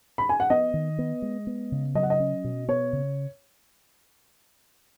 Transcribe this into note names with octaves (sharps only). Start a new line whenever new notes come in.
B5
G#5
F#5
B3 D#5
D#3
B3
G#3
B3
C#3
F#3 D#5
F#5
D#5
C#4
B2
B3 C#5
C#3